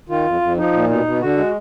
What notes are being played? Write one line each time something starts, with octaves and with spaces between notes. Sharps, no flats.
D#3 F4
F2
F2
F3 D#4
A#2
B2 D#4
B2
D3 F#4
G#3